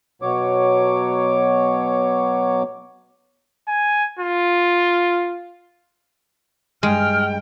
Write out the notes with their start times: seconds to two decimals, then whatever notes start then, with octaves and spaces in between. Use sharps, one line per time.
0.22 B2 F#3 C#5 D6
3.68 G#5
4.19 F4
6.83 G2 G#3 G5 F6